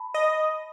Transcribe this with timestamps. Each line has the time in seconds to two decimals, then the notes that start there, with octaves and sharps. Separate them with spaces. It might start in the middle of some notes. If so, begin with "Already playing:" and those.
Already playing: A5 B5
0.14 D#5